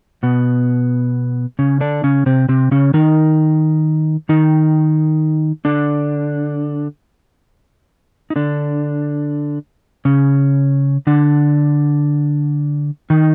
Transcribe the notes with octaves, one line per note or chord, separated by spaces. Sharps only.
B2 B3
C#3 C#4
D3 D4
C#3 C#4
C3 C4
C3 C4
C#3 C#4
D#3 D#4
D#3 D#4
D3 D4
D#4
D3 D4
C#3 C#4
D3 D4
D#3 D#4